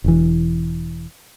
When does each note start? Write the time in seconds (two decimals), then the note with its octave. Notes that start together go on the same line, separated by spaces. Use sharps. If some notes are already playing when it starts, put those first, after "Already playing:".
0.04 E1 E3